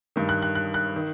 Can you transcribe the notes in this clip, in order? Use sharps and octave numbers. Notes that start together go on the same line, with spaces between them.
G2 D#3
F#6
F#6
F#6
F#6
D#3